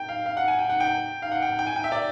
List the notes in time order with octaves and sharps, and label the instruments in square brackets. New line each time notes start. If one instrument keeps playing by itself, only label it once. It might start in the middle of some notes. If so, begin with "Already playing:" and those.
Already playing: [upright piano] G5
F5
F5
F#5
G#5
G5
F#5
G5
F5
F#5
G5
G5
G#5
G5
E5
D5